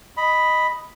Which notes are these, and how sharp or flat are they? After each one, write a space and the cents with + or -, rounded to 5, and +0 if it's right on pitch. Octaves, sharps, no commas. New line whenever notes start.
D#5 +0 B5 +0